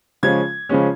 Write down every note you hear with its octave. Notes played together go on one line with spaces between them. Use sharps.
C#3 F3 G#3 C#4 G#6
C#3 F3 G#3 C#4